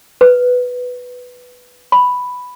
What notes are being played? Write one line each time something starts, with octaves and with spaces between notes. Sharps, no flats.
B4
B5